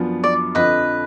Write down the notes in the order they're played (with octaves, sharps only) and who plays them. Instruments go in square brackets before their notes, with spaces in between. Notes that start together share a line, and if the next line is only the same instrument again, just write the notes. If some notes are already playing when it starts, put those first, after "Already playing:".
Already playing: [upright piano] F#2 F3 B3 D4 F4
[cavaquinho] D5
[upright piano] F2 D3 F3 [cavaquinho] B4 D#5